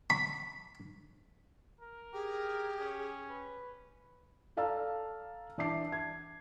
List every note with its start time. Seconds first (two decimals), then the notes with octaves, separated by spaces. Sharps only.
0.10 B5
1.81 A#4
2.14 G4 G#4
2.80 C#4
3.29 B4
4.57 A4 D5 F5 A5 A#5 E6
5.58 E3 D4 E5 A5 D6 C7
5.92 G#6